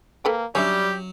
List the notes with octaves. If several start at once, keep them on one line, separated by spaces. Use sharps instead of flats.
A#3 A4 B4 G5
F#3 G3 C#4 D4 G4 E5